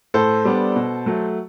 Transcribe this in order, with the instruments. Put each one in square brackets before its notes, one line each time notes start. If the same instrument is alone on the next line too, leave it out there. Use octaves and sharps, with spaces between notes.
[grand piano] A2 A4 C5
G3 B3 D4
B2
F#3 A3